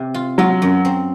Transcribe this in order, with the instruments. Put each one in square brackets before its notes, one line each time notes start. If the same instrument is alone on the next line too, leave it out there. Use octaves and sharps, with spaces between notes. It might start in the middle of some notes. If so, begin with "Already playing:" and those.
Already playing: [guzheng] C3
F4
[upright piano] F#3 [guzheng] F4
[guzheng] F#2
C4